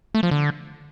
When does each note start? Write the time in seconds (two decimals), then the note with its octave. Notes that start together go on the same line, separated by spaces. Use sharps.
0.15 A3
0.23 F3
0.31 D3